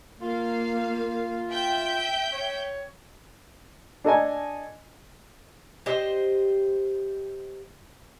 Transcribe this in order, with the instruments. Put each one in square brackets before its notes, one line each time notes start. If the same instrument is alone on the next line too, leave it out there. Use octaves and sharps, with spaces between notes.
[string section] A#3 F5 [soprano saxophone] F4
[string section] E5 G5 G6
[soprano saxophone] C#5
[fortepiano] D4 A4 D#5 G#5
[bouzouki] G4 C5 D#5